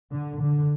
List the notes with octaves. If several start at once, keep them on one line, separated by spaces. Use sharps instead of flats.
D3
D3